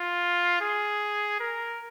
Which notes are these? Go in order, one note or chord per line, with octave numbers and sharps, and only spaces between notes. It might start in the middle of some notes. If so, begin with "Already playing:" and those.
Already playing: F4
G#4
A#4